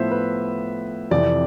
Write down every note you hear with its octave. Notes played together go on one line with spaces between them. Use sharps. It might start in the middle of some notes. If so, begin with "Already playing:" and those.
Already playing: A2 F3 B3 E4 C5 E5
B4
F2 C3 E3 D5